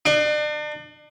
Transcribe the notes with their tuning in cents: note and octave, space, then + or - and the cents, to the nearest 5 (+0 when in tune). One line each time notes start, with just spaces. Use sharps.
D4 +40